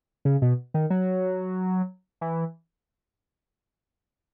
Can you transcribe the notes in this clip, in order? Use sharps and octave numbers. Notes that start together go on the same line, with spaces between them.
C#3
B2
D#3
F#3
E3